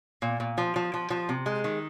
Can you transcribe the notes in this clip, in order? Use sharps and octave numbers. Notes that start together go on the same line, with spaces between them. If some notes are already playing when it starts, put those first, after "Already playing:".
A#2
A#2
F3
F3
F3
F3
C3
G#3
D#3